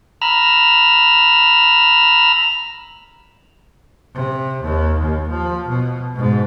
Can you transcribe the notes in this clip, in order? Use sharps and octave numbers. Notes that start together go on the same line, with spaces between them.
A#5 B5 E6 F6
C3
D#2
D#2
F3
B2
G#2 B2